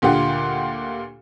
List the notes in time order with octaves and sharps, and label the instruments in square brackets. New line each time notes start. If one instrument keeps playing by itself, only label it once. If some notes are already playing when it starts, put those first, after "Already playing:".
[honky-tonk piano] D2 A#2 D3 F4 G4 F#5